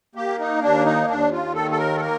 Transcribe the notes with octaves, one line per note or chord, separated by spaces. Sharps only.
A#3 G4
D#4
D#2 D4
D#4
D#2 D4
F4
D#3 A4
A4
A#4
A4
A#3 A#4